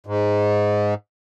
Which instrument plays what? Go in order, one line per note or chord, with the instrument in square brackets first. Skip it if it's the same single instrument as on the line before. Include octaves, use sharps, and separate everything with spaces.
[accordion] G#2